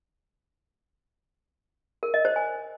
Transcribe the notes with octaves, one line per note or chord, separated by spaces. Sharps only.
A#4
D#5
C5
G#5